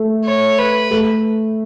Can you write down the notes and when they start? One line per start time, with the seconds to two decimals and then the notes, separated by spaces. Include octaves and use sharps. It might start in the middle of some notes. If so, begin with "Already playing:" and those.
Already playing: A3
0.25 C#5
0.58 B4
0.91 A3